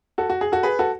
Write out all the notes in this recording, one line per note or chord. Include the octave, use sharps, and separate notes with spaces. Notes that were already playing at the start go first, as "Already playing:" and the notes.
F#4 A4
F#4
G#4
F#4 A4
G#4 B4
F#4 A4